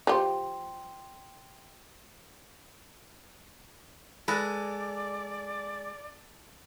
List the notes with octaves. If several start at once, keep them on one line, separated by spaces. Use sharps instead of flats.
F3 G4 G5 C6
G#3 A4 B4 D5